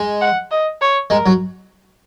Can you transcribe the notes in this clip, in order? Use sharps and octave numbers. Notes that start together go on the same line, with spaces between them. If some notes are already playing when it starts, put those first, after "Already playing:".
Already playing: G#3
F#5
D#5
C#5
G#3 A#4
F#3